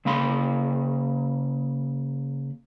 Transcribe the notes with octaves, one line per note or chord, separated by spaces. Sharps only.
C#3 A#3 F5 B5 C6